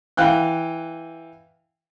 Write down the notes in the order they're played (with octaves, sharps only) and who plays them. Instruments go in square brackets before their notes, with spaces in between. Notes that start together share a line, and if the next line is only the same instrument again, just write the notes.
[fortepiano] E3 F5 G5 F#6